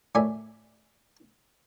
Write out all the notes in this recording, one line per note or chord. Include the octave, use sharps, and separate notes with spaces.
F#2 A2 D5 E5 G#5